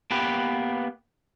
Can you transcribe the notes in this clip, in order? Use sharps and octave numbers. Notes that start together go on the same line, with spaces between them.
A#3 B3 G4 B4